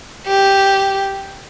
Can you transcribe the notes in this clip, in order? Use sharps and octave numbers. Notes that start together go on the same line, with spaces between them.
G4